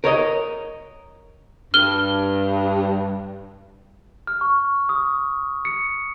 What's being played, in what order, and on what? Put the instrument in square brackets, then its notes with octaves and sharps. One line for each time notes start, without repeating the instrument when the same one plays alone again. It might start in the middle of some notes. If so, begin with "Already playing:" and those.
[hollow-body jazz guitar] A#4 C#5 D#5
[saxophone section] G2 [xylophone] F6 G7
[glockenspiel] F6
C#6
D#6
C#7